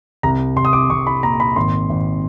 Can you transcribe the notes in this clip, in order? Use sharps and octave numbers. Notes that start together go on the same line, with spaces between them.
C2 A#5
C2 C6
D#6
D6
C2 C#6
B5
A#2 A#5
B5
G#1 C6
G#1